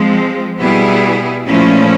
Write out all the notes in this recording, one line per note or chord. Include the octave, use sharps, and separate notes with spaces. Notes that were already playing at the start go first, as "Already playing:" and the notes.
Already playing: F3 G#3 C4
B2 G3 B3 E4 G#4
A#2 F3 A3 C#4 E4